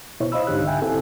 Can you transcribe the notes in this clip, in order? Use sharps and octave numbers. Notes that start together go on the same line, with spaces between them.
B2 E4 C5 C#5
C5 D#5 F5 B5 E6
C2 G#2 D3 D#4 G4 F#6
E5 G5 G#5
C4 E4 A4